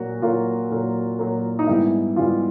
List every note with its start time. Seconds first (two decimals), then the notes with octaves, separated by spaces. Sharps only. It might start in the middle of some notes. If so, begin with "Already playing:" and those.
Already playing: A#2 F#3 A#3 F#4
0.22 A#2 F#3 A#3 F4
0.71 A#2 F#3 A#3
1.19 A#2 F#3 A#3
1.59 D#4
1.67 G#2 E3 G3 B3 E4
2.16 G#2 E3 G3 B3 F4